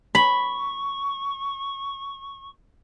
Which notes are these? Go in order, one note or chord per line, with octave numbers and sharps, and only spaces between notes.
B5 C#6